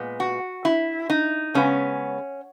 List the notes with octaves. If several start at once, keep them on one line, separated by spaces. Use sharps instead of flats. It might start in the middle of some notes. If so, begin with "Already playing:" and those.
Already playing: A#2 G#3 B3
F#4
E4
D#4
C#3 G#3 B3 C#4